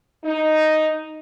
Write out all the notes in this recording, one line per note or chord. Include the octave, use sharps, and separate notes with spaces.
D#4